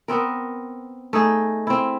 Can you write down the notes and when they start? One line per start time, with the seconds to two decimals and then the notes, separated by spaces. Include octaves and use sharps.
0.08 B3 C4 A#4
1.13 A3 D#4 G#4
1.67 C4 E4